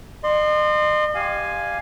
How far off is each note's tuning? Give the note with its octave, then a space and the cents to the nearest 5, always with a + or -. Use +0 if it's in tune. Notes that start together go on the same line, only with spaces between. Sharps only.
D#5 -40 C6 +0
G4 +0 F5 +0 G#5 +0